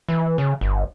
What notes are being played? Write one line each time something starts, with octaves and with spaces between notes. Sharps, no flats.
E3
C#3
G1